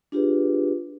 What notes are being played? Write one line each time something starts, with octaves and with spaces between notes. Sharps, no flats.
D4 F4 G4 G#4 B4